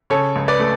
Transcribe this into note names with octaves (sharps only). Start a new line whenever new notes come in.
C#3 A4 C#5
C#2
B4 D5
A3